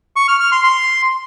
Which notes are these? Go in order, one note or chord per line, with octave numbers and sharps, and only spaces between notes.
C#6
F6
F6
C6
C6